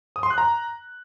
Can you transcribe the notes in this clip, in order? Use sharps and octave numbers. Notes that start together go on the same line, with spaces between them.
D#6
C6
F#6
A#5